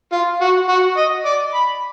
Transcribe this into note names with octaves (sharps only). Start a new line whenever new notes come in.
F4
F#4
F#4
D#5
D5
B5